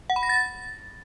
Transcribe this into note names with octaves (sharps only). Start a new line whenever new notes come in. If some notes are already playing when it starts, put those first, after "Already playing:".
F#5
B5
A#6
A6